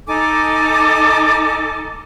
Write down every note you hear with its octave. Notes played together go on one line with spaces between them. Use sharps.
D#4 A4 G#5 D6